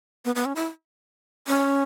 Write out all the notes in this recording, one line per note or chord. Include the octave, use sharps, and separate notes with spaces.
B3
B3
C#4
E4
C#4